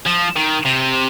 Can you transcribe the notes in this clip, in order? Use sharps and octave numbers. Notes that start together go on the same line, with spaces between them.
F3
D#3
C3